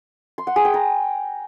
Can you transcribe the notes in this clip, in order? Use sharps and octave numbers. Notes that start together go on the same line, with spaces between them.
C6
F#5
G#4
G5
A#5